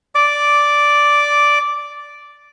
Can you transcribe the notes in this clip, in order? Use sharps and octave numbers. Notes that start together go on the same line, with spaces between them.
D5 D6